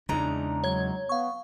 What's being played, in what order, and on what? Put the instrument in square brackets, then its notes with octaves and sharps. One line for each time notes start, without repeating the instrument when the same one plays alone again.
[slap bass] E2 C#3 [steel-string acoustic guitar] G#3 D#4 A#5 [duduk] D4
[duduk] F#3 [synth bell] C#5 G#6
[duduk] B3 [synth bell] F5 C#6